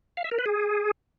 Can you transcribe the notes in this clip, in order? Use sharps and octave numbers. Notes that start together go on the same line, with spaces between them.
F5
E5
A#4
B4
G#4